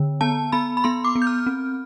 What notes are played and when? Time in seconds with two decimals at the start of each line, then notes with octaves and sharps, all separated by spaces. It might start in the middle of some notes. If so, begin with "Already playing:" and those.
Already playing: D3
0.21 B3 A5
0.52 B3 B5
0.77 B5
0.84 B3 C6
1.04 D6
1.15 B3
1.22 G6
1.27 F6
1.46 C4